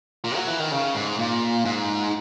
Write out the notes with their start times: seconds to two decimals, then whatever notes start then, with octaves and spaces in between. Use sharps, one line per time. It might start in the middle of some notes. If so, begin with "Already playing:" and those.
0.24 A#2
0.36 F#3
0.48 E3
0.59 D#3
0.72 C#3
0.95 G#2
1.19 A#2
1.65 G#2